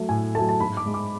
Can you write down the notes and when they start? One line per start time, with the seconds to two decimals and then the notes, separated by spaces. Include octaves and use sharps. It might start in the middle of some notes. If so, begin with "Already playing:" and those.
Already playing: F#3 A3
0.09 A2 G#5
0.35 F#3 A3 A5
0.49 A5
0.60 G#2 B5
0.77 D6
0.86 G#3
0.94 D6